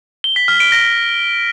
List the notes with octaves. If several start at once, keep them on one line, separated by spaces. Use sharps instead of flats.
G7
B6
F6
D7
A#6